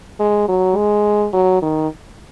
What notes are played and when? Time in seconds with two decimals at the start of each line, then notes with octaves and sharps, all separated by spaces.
0.19 G#3
0.49 F#3
0.76 G#3
1.33 F#3
1.62 D#3